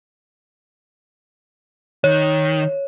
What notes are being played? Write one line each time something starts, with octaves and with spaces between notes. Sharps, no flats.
D#3 C#5